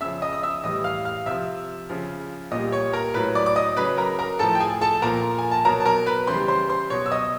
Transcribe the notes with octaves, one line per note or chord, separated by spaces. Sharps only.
C#3 F3 E5 E6
D#5 D#6
D#6
E5 E6
A2 E3 G3 D#5 D#6
F5 F6
F5 F6
C3 F3 E5 E6
C#3 F3
A#2 G3 D#5 D#6
C#5 C#6
A#4 A#5
A2 F#3 B4 B5
D5 D6
D6
D#5 D#6
C#3 F#3 B4 B5
A#4 A#5
A#4 A#5
A2 F3 A4 A5
G5
G#4 G#5
A4 A5
A#2 F3 A#4 A#5
G#5
A5
B2 F#3 A#4 A#5
A5
A#4 A#5
B4 B5
C#3 E3 G3 C5 C6
C5 C6
C5 C6
B2 F#3 C#5 C#6
E6
D#5 D#6